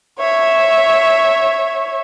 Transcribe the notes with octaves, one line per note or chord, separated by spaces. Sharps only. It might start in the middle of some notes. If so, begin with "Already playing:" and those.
C#5 E5